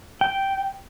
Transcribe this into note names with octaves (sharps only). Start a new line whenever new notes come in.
G5